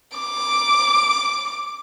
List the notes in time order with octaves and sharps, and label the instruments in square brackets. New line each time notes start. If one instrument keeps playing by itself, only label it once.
[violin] D6